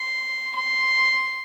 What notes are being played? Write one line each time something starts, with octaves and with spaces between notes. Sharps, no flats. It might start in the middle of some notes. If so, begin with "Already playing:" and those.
Already playing: C6
C6